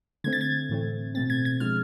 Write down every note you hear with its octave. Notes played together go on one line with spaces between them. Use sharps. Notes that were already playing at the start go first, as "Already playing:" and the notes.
D3 A3 C4 G#6
A6
G#6
A2 E3 A3 C4
B2 A3 C4 A6
G#6
G#6
D3 F3 G#3 F6